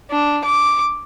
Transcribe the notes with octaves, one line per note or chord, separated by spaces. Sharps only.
D4
D6